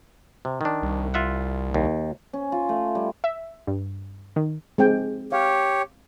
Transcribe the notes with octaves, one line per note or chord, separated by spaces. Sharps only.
C3
D#3 D4
C2
F4 E5 F#5
D#2
C#4
F4
A3
G3
E5
G2
D#3
G#3 C4 G5
G4 C#5 F5